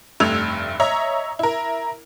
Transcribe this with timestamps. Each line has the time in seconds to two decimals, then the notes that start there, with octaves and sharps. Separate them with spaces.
0.20 F1 G2 A3 E6 G#6 F7
0.80 C#5 D#5 E5 A#5
1.39 E4 A#4